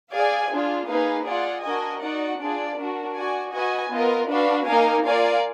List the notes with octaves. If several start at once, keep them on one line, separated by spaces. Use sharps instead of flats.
G#4 D5 F5 G#5
D4 F4 G#4
A#3 D#4 G#4 B4 F5
F4 G#4 D5 F#5
D4 F#4 A#4 D#5 G#5
D#4 F#4 D5 F#5
D4 F4 G#4 D5
D4 F#4 A#4
F#4 D5 G#5
F#4 B4 D#5 G#5
B3 F4 A#4 D#5
D4 F#4 B4 F5
A#3 D#4 A#4 F5 G#5
F4 A#4 D5 F5 G#5